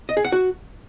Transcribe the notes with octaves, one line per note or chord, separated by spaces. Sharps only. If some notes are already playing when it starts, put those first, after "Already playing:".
D#5
G#4
F#5
F#4